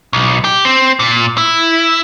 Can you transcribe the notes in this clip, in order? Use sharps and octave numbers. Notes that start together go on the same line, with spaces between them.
B1
G4
C4
A#2
E4